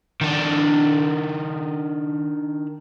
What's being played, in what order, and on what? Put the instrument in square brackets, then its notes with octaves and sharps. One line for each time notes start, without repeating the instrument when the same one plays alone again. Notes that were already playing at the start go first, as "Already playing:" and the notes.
[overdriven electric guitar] D#3 D4